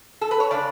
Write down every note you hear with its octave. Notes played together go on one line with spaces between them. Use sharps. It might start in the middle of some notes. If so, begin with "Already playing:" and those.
A4
B4
C#5
C#3 G#3 D4 D5